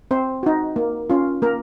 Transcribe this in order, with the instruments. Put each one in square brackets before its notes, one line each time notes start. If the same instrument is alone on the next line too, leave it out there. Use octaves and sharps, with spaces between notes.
[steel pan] C4 C5
D#4 F#4
A#3
C#4 F4
A#3 A#4